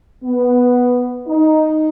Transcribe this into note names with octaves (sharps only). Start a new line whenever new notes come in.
B3
D#4